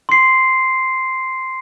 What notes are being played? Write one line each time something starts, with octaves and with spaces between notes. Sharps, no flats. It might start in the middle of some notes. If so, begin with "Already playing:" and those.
C6 C7